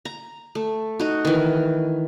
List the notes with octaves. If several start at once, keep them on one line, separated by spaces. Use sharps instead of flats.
A#5
A3
D#4 F#4
D#3 E3